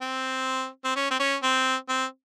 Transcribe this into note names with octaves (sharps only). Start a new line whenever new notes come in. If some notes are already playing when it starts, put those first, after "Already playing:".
C4
C4
C#4
C4
C#4
C4
C4